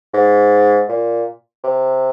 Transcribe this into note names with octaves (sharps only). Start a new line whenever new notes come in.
G#2
A#2
C3